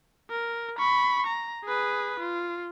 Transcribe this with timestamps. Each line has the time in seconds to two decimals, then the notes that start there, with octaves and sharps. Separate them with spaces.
0.30 A#4
0.78 B5 C#6
1.27 A#5
1.65 G#4 B4
2.20 F4